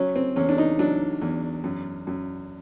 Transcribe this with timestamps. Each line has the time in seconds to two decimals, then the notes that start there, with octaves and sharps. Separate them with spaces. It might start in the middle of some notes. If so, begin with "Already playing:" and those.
Already playing: F#3 C#4
0.16 C4
0.36 E2 C#4
0.49 D4
0.58 D#4
0.79 F#3 D4
1.22 E2
1.64 F#2
2.07 F#2